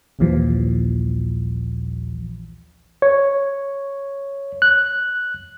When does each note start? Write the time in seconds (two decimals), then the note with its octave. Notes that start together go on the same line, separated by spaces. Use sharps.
0.19 A#1 D#2 A#2 E3 F3 G3
3.02 C#5
4.62 F#6